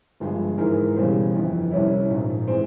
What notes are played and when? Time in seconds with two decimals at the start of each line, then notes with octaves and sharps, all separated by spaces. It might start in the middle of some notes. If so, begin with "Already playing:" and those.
0.20 G1 G2 F3 G#3
0.58 G#2 E3 G#3 E4 A#4
0.96 E1 E2 C#3 G3 C4
1.34 G1 F2 E3
1.71 C2 C3 G3 C#4 E4
2.10 A#1 G#2 F3
2.48 E3 G#3 C4